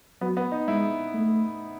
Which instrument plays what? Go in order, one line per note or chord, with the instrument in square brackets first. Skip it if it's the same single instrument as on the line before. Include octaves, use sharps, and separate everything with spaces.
[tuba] F#3 [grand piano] B3
[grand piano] B3
D#4
[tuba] G#3 [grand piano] E4
[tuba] A3